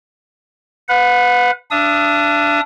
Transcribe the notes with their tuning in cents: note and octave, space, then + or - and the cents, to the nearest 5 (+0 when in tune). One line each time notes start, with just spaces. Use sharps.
B4 +15 F#5 -35
D4 +0 E5 +45 D#6 +20